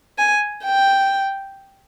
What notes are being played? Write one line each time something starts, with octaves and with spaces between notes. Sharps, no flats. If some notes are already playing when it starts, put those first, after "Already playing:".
G#5
G5